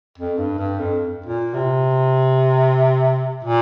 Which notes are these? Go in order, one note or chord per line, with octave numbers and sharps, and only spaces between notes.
F2
G2
G2
F2
A#2
C3
A#2